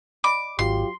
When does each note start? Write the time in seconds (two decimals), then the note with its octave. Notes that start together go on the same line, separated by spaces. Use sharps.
0.24 D5 D#5 B5 D6
0.59 G#1 F#3 F4 G4 C6